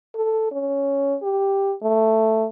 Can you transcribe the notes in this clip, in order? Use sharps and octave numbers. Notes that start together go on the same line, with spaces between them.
A4
C#4
G4
A3